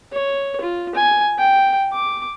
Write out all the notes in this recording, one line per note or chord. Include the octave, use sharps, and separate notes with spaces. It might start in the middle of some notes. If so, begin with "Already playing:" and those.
C#5
F4
G#5
G5
D6